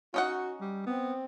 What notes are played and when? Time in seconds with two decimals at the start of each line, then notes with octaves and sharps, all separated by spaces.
0.14 C#4 D#4 F#4 F#5
0.61 G3
0.87 B3 C4